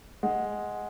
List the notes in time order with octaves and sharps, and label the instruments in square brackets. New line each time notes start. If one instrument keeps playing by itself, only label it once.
[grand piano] G#3 [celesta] F#5